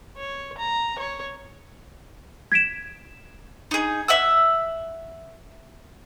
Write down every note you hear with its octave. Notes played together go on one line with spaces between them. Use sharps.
C#5
A#5
C#5
G#6 B6 D7 E7
D#4 G#4
E5 F#5 E6